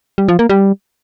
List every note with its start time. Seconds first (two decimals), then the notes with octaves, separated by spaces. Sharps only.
0.18 G3
0.29 F3
0.39 A#3
0.50 G3